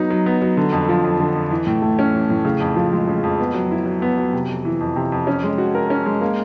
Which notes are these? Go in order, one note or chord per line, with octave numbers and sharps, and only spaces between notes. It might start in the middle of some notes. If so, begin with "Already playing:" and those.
Already playing: F#3 B3 D#4
F#3
B3
F#3
D3
F2
F3
F2
D3
F2
E3
A2
A3
C#4
E3
A2
C#3
F2
F3
G#3
C#3
F2
B3
F#3
E4
F#3
B3
F#3
C3
F2
E3
F2
C3
F2
C#4
G#3
F#4
A#4
C#4
G#3
A#3